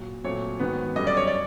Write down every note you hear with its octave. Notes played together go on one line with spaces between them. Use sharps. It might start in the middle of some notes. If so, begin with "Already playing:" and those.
Already playing: A#2 F#3
A#2 F#3 A3 C4 C#5
G#2 D#3 F#3 B3
F#2 D3 G3 D#5
D5
C#5
D5